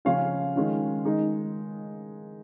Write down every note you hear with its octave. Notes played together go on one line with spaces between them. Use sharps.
C#3 F3 C#4 F4 F5
D#3 G#3 C#4 F4
D#3 G#3 D#4